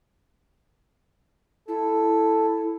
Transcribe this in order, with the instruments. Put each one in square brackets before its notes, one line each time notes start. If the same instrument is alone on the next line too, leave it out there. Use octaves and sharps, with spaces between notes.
[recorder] E4 [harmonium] A4